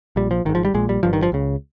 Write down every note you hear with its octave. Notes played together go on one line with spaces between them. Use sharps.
A#1 A#2 G3
F3
G#1 G#2 D#3
F3
G3
A#1 A#2 G#3
G3
G1 G2 F3
D#3
F3
C#2 C#3